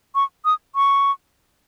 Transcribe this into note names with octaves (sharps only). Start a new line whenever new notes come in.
C#6
D#6
C#6